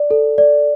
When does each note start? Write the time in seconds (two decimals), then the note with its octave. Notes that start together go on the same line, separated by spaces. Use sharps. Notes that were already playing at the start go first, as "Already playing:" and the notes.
Already playing: D5
0.11 A4
0.38 D5